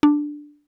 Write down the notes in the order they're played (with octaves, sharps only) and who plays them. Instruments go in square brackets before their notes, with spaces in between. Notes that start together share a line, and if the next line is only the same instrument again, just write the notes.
[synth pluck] D4